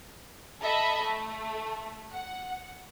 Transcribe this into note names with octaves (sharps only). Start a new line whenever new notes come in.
A4 D#5 E5 A5 B5
A3
F#5